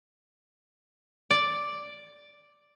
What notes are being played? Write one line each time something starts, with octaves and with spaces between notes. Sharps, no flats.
D5